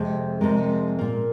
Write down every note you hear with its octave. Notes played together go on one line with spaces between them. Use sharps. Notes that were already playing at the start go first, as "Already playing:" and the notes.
Already playing: F2 C3 G#3 C4
F2 C3 G#3 A#4
A#2 A#3